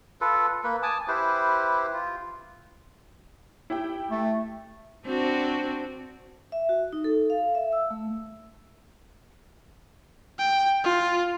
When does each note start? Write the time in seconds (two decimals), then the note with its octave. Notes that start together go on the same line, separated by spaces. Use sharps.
0.21 F4 A4 B4
0.64 A#3 B4
0.83 G#5 A5 D6 D#6
1.08 E4 G4 B4 C5
1.93 F4
3.70 E4 G4 G5
4.11 A3
5.06 C4 D4 F#4
6.52 E5
6.69 F#4
6.93 D#4
7.04 A4
7.30 F5
7.55 E5
7.73 E6
7.90 A3
10.38 G5
10.84 F4